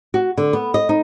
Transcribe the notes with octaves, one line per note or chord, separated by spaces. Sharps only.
F#4
D3
B3
D#5
D#4